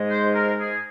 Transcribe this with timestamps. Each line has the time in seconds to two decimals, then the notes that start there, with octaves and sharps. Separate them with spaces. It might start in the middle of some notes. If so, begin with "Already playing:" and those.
Already playing: G#2 G#3
0.09 C5
0.34 A#4
0.59 G#4